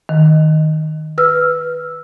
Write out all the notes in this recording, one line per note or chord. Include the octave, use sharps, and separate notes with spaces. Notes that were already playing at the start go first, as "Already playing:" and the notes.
D#3
B4 E6 F6